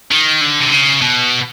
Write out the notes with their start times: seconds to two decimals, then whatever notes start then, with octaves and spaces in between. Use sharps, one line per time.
0.11 D#3
0.41 D3
0.60 C3
0.72 C#3
1.01 B2